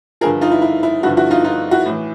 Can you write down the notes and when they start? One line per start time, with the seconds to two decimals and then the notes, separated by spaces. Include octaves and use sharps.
0.21 G2 D3 F3 G#4 A#4
0.41 D#4 F4
0.52 E4
0.62 E4
0.83 E4
1.03 G2 D3 F3 E4 F#4
1.17 E4 F#4
1.31 D#4 F4
1.44 D#4 F4
1.71 E4 F#4
1.86 A2 E3